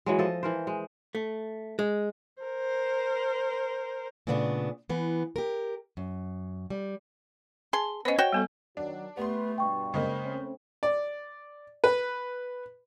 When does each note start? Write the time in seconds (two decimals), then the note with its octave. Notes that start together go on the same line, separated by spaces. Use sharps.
0.06 E3 F#3 G#3
0.19 F3 A4 D#5
0.43 E3 A#4 C5
0.67 G#3
1.15 A3
1.79 G#3
2.42 A#4 C5
4.27 A#2 C#3 A3 B3 C4 D4
4.89 E3 B3
5.36 G4 A#4
5.97 F#2
6.70 G3
7.73 G#4 A5 C6
8.05 B3 C#4 C5 D#5
8.18 F#4 C#5 G5
8.33 G3 B3 A4
8.77 D#3 F#3 D4
9.17 A3 B3 G4 B4 C6
9.58 G2 B2 G5 C#6
9.94 C#3 G#3 A#3 C5
10.25 A3 C4 C#4
10.83 D5
11.84 B4